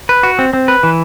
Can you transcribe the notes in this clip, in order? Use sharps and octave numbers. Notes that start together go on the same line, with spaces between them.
B4
F#4
C4
C4
B4
E3